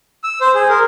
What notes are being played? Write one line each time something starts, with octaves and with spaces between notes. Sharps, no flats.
E6
C5
G#4
A#4